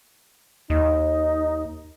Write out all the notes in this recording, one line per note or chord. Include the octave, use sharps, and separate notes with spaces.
D#2 D#4